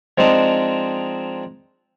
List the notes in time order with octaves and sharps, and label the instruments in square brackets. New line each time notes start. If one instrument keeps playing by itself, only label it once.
[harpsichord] F3 G#3 C4 D4 D#4